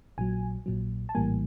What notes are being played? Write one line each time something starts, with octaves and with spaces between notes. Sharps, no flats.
A#1 A#2 F#3 G#5
A#1 A#2 F#3
A5
A#1 A2 E3 G3 A#3 G#5